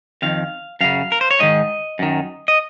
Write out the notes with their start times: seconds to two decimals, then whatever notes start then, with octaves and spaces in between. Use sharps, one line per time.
0.22 F2 D#3 F5
0.81 F#2 C#3 F5
1.12 A#4
1.21 C5
1.31 C#5
1.40 G#2 D#3 D#5
1.99 F#2 D#3
2.48 D#5